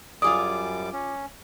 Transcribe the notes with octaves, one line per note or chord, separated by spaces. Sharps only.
F#2 G3 F4 G#4 D5 D6 D#6
C#4